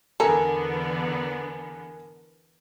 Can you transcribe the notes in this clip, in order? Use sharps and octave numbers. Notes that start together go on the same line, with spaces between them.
E2 D3 B3 A4 A#4 G#5 A#5